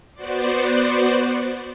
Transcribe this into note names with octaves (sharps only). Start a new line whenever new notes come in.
B3 F#4 C5 D5